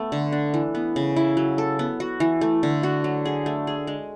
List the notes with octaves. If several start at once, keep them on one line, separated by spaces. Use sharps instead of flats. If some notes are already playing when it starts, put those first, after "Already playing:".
Already playing: A3 B3
D3
D4
E3
B3
C#3
E4
F#3
A4
B3
F#4
E3
A3
D3
F#4
F#3
G#4
A3
G#4
G#3